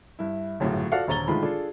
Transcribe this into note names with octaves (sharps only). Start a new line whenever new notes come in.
G2 E4
G1 F#2 A2 C#3 F#4
F4 F#4 A4 D5 F5 F#5
D#1 D3 C#5 A#5 A6 G7
A2 D3 D#3 G#3 F4 B5
D4 F4 G#4 A4